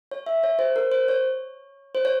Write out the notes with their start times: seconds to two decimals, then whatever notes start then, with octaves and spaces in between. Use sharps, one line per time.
0.11 C#5
0.26 E5
0.44 C#5
0.59 C5
0.76 A#4
0.92 C5
1.08 C#5
1.95 C5
2.05 C#5